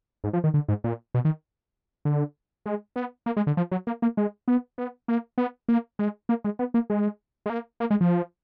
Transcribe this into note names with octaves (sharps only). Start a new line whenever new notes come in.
G#2
F3
D#3
D3
G#2
A#2
B2
D#3
D3
G#3
B3
A#3
G#3
D3
F3
F#3
A#3
A#3
G#3
B3
B3
A#3
B3
A#3
G#3
A#3
G#3
B3
A#3
G#3
G#3
A#3
A#3
G#3
F3